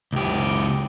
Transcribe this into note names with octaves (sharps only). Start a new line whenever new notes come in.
C#2 G4